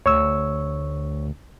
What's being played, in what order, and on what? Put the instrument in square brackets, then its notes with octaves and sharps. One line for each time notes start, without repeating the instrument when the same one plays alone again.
[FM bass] D2 [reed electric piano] C#5 C#6 E6